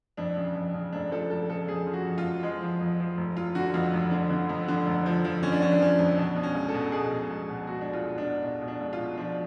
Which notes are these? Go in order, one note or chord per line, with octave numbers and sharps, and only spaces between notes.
F2 D4
C#3
F2
C#3
F1 D4
F3 A4
F1 A4
C#3 A4
F2 G#4
F3
F#4
F2
F4
F2
F3 G#3
F3
F2
F3
F1
F1 F4
D3 F#4
F2 F4
F1
D3
D3
F2
D3
F1
F3
F3
D3 C#4
D4
F3 C#4
D4
F3 C#4
F2
B2 D4
B2
C#4
C#2
A4
B2
B2 G#4
B2
C#2
B2
C#2 F#4
B2 D4
F4
C#2
D4
B2
B2
B2
D4
C#2
F4
B2
F3 D4